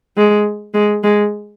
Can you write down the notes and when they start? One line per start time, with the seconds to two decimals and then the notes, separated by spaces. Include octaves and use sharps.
0.17 G#3
0.74 G#3
1.03 G#3